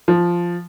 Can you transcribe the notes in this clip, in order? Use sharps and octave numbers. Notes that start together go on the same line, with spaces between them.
F3